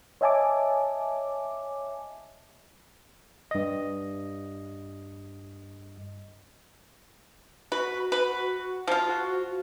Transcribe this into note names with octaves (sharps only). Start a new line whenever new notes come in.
C#5 D#5 E5 G#5 A5 D6
G2 D#5
F#4 B4
B4
F3 F4
F#4